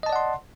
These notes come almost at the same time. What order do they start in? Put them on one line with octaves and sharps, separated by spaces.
D#5 A5 D5 F#5 C6